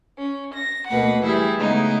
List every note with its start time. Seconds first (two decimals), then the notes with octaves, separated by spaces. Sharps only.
0.19 C#4
0.56 A#6
0.88 D2 B2 A#3 B4 F#5
1.23 E3 G3 E4 G#4
1.58 C#3 G#3 A3 B3 D#4 E4